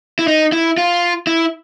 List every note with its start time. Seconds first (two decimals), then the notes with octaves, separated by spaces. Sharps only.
0.19 E4
0.27 D#4
0.52 E4
0.78 F4
1.27 E4